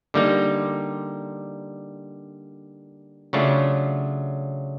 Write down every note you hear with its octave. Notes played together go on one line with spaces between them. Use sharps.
D3 G3 A#3 D#4
C#3 F#3 A3 D4 F4